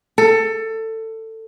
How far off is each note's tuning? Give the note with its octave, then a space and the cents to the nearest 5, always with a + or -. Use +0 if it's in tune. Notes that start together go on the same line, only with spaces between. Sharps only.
A4 +20